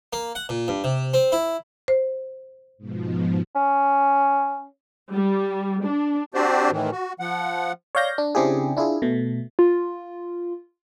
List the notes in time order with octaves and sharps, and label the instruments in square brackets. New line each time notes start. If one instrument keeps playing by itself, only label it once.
[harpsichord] A#3
F#5
A#2
G2
C3
C4
E4
[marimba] C5
[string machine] G#2 B2 F3
[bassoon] C#4
[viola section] G3
D4
[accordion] C4 D4 F#4 G4 C5 D5
A2 D#3 E3
F#4
F3 F#5
[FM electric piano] C#5 D5 F5 G6 A#6
D4
C#3 C4 D4 E4 G4 G#4
D4 E4 F4 G#4
B2 A3
[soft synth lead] F4